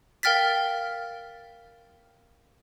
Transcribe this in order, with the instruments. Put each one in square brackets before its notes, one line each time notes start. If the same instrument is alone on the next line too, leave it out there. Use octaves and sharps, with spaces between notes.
[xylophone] A#4 F5 G5 F6 A6 B6